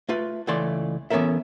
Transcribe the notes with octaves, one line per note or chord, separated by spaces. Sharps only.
A3 F4 B4
C#2 E3 A3 D5 C6
E3 B3 C#4 A4 A#4 E5